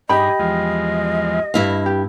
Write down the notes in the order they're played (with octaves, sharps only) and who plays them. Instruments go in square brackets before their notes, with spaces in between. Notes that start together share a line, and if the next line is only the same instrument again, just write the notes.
[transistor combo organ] G2 D#4 G#4 [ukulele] G4 G5 B5 [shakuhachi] D#5
[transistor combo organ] E2 F3 G#3
[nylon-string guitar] G2 E4 F5
[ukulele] G4